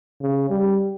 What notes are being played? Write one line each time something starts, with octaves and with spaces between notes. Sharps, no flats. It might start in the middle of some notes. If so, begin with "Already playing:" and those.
C#3
G3